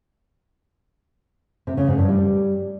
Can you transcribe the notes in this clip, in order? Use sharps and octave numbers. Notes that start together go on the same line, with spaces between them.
C3
C#3
G#2
G2
G3